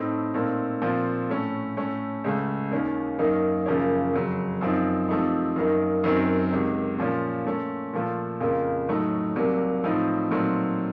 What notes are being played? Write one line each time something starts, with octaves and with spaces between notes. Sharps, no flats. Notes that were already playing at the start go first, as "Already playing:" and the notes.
Already playing: A2 A3 C4 D#4
A#2 A3 C4 D#4
A#2 F3 C4
A2 A3 C#4
A2 A3 C#4
C#2 C#3 A3
D#2 D#3 A#3 C#4
F#2 D#3 A#3 D#4
F#2 C#3 F3 A#3 C#4
F2 C#3 F#3
F#2 F3 C4 D#4
C3 F3 A3 C4 D#4
F#2 D#3 A#3 D#4
F#2 D#3 F#3 C4
C#2 C3 D#3
A#2 F3 A#3 C#4
A#2 A3 C#4
A#2 F3 A3
F2 C#3 F3 A#3
A2 F#3 A3 D#4
C2 C3 F#3 A#3
A2 F3 C4 D#4
A#2 F#3 A3 C4 D#4